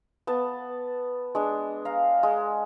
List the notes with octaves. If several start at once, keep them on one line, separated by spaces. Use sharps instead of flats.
B3 A5
G#3 D4
F5 A#5
G#3